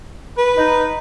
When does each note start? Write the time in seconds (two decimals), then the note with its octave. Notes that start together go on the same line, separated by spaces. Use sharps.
0.38 B4
0.57 D#4